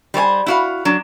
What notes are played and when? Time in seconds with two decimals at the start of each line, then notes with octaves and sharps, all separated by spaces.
0.14 G3 C5 C#5 G#5
0.47 E4 F#4 F5
0.85 F#3 D4